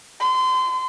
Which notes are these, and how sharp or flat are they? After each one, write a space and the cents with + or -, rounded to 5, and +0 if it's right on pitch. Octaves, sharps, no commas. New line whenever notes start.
C6 -30